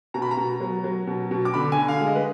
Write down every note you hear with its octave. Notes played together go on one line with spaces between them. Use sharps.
B2 A#5
B5
A#5
B2
F#3
F#3
B2
B2
D6
D3 B5
G#5
D3
F5
G#3
D#5
B4